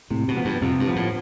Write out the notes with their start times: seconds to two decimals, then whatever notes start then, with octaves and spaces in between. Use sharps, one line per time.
0.11 A2 C3
0.28 B2
0.36 F3 B3
0.45 G2
0.62 F2 C3
0.80 G2
0.87 F3 B3
0.96 A2